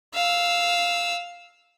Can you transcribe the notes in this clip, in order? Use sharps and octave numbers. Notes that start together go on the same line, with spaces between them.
F5 E6